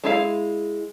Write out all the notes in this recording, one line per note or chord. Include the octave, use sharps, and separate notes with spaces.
G#3 E4 F5